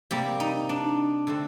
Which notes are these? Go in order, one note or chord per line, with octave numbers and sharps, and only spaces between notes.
C3 G3 A#3 G4
D#4
D4
D3 A3 C4